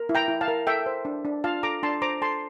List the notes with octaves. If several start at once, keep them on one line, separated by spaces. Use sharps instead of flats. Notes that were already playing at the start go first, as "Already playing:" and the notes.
Already playing: A#4
E4
G5 A#5
E4
F5 A5
A#4
A4 E5 G5
C5
D4
D4
F4 F5 A5
A4 A#5 D6
D4 A5 C6
C5 A#5 D6
A4 A5 C6